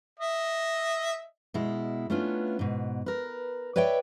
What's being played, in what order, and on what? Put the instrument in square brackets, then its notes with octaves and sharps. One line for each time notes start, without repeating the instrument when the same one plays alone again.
[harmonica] D#5 E5
[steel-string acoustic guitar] B2 G#3 E4
A3 B3 C#4 D4 F4
G#2 B2
A#4 B4
B4 C#5 D5 E5 G5